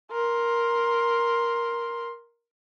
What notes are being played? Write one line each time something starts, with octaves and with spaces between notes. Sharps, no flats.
A#4 C6